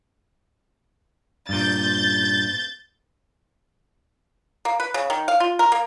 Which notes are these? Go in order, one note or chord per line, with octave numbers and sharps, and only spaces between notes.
G2 A#2 G6 A6
A#3
B4
C#3
D#3
F5
F4
A#4
A#3